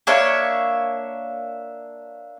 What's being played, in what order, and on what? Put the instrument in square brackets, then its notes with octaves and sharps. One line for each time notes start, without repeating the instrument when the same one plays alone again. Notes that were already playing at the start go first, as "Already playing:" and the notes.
[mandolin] A#3 D4 C#5 E5